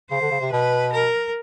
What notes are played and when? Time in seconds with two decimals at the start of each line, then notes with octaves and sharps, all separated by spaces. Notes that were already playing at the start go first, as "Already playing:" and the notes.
0.10 C#3 C5
0.21 D3
0.31 C#3
0.41 C3
0.51 B2 B4
0.92 A#4